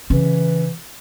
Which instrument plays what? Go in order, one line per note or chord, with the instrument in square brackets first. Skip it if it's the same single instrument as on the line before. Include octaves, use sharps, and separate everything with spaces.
[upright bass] C#3 C#4 [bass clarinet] E3